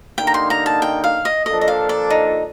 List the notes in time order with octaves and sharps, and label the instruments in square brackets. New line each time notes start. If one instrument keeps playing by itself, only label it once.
[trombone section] D3 G3 A#3 D#4 [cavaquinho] G5
[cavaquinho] A#5
C6
A#5
A5
G5
F5
D#5
[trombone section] A#2 F3 A#3 D4 A4 [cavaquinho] D#5
[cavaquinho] D#5
F5
D5
D#4